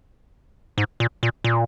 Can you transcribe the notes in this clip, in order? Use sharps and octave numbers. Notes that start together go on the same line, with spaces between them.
G#2
A#2
A#2
A#2